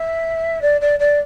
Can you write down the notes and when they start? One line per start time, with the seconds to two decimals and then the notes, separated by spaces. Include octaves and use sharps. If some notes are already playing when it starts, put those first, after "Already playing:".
Already playing: E5
0.61 D5
0.80 D5
0.99 D5